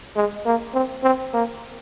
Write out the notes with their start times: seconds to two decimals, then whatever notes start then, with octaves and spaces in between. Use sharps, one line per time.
0.16 G#3
0.46 A#3
0.74 C4
1.04 C4
1.34 A#3